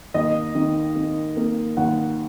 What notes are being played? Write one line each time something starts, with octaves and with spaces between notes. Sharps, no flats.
D#2 D#5
D#3
D#3
A#3
D#2 F#5